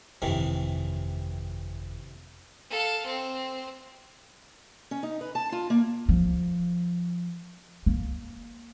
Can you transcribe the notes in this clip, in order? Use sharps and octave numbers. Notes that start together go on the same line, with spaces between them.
G1 F2 C3 D#3 E3
A4 F5
C4
C#4
D#4
B4
A5
F4
A#3
F3
A#3